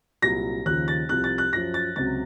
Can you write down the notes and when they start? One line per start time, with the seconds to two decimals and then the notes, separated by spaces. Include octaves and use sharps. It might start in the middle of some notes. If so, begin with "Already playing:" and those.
0.22 C2 A#2 F#3 A#6
0.66 D#2 C#3 F3 F#6
0.88 A6
1.09 C2 C3 F3 F#6
1.24 A6
1.38 F#6
1.53 F#2 F3 A#6
1.74 A6
1.96 C#2 C3 F#3 A6